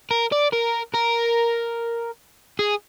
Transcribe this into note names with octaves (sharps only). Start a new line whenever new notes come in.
A#4
D5
A#4
A#4
G#4